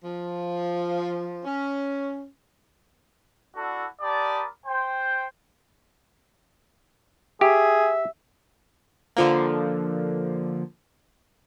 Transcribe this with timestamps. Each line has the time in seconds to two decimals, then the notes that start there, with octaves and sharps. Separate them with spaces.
0.04 F3
1.45 C#4
3.56 D4 E4 F#4 A4
4.02 G4 A#4 D5 A5 B5 D#6
4.66 C5 G5
7.41 G4 G#4 E5
9.16 D3 F3 A#3